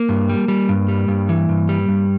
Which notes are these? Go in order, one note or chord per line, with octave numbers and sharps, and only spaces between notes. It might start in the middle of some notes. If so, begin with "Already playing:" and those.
Already playing: A#3
G2
G3
G3
G2
G3
G2
E3
G2
G3
G2